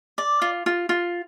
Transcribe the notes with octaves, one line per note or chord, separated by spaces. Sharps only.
D5
F4
F4
F4